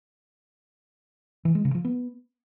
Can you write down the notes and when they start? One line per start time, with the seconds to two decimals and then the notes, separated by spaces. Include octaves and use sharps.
1.45 E3
1.55 G#3
1.65 C#3
1.75 F3
1.85 B3